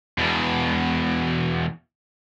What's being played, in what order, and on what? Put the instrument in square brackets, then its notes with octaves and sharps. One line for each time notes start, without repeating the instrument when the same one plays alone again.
[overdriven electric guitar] E2 B2